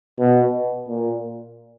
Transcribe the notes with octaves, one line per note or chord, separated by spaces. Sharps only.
B2
A#2